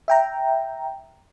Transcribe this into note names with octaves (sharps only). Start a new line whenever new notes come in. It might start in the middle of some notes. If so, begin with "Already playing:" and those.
E5 G5 A#5